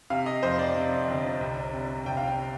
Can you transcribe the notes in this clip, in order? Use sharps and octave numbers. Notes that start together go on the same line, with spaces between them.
C3 F5
D#5
F2 C5
D5
C3
G1
C2
C3
C2 G5
F5
G5